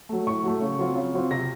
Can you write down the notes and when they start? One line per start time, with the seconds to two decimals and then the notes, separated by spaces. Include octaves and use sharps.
0.09 F#3 A3
0.27 A2 C#6
0.44 F#3 A3
0.62 C#3
0.79 F#3 C4 F4
0.96 C#3
1.14 F#3 C4 F4
1.31 C3 A#6